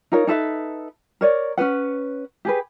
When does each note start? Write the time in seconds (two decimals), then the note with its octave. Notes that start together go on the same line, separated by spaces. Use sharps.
0.12 D#4 F4 A#4 C#5
0.27 D#4 A4 B4 E5
1.21 A#4 C#5 D5
1.58 C#4 A4 B4 F#5
2.45 G4 G#4 B4